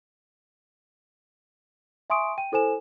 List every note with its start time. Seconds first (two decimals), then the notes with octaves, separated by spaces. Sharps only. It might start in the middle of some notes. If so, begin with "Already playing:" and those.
2.10 E5 G#5 C6 C#6 D#6 D7
2.38 G5 D#7
2.52 E4 A4 C5 G#5 E7